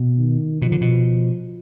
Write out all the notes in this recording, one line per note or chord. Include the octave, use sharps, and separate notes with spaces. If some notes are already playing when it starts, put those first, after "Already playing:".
Already playing: B2
D#3
B2 F3
D3
B2